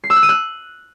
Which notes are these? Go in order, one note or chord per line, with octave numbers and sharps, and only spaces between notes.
C7
E6
F#6
D#7
F#6